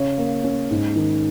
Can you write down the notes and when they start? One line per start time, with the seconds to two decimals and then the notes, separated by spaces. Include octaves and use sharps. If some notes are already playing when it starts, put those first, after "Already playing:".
Already playing: C#3 C#5
0.18 A#3
0.44 C#4
0.71 G#2
0.96 D#3